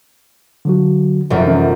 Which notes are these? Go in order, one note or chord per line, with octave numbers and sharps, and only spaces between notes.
D3 F#3 F#4
F1 F#2
E3 C#4 A#4